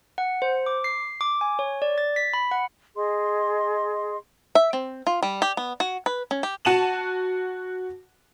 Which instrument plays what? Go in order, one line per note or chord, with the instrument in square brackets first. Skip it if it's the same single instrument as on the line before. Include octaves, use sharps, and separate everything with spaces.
[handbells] F#5
C5
D6
C7
D6
G#5
C#5
D5
A6
B6
B5
F#5
[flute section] G#4 D#5 C6
[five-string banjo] E5
C4
F4
G3
G4
B3
F#4
B4
C#4
G4
[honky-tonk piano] F#4 F#5 A5 D#7 E7 F#7